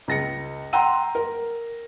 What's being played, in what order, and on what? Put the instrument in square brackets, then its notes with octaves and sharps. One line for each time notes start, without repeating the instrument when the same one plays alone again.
[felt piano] C#2 A#6 C#7
F#5 G5 A#5 C6 E6 D#7
A#4